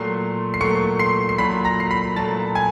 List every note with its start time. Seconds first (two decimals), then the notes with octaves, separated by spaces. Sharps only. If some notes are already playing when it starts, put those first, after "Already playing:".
Already playing: A#2 F#3 A3 C6 C7
0.54 C7
0.61 A#2 F#3 A3 C#6 C#7
0.99 C6 C7
1.29 C7
1.38 A#2 F#3 A3 B5 B6
1.65 A#5 A#6
1.80 C7
1.91 B5 B6
2.16 A#2 F#3 A3 A5 A6
2.55 G#5 G#6